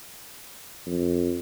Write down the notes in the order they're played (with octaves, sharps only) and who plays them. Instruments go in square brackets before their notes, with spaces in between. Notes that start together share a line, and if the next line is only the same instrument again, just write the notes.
[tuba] F2